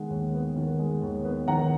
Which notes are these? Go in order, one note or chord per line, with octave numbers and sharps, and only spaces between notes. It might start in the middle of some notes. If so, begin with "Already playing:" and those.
Already playing: D#3 G#3 B3 F#5
D#2
B3
D#3
G#3
D#2
B3
D#3 F#5 A#5